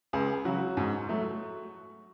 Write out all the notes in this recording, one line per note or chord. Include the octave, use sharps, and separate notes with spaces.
C#2 G#4
C#3 F#3 F#4
G#2
F#3 A3